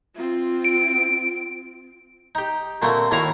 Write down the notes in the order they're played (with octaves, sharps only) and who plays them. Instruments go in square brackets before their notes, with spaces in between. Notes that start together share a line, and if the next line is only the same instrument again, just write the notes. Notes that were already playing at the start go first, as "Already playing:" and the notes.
[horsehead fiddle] C4 F4
[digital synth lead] D7
[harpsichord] D#4 G4
A#2 D3 A3 A#3 C4
D#2 A2 E4 F#4 F5 A#5